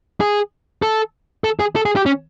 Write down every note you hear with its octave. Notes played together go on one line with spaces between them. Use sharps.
G#4
A4
A4
G#4
A4
G#4
G4
C#4